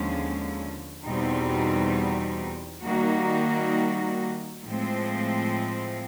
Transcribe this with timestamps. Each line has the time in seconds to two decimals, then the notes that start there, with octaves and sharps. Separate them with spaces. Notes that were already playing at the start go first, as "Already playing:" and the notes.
Already playing: D#2 D3 F3 G#3 C#4
1.03 E2 B2 G3 C4 D#4
2.83 D#3 G3 A#3 D#4 F#4
4.63 A2 F3 G#3 C4